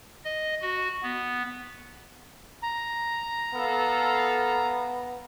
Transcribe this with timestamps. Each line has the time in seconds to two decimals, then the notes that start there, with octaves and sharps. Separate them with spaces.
0.25 D#5
0.62 F#4
1.02 B3
2.63 A#5
3.54 B3 A4 F5